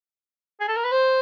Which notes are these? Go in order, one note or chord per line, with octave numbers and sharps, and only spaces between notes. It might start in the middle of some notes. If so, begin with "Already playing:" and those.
G#4
A4
A#4
B4
C5